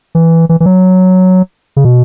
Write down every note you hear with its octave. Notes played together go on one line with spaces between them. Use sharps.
E3
E3
E3
F#3
C#3
B2